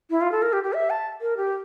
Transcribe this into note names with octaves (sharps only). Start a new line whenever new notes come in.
E4
F4
A4
A#4
G4
G4
E5
A5
A#4
G4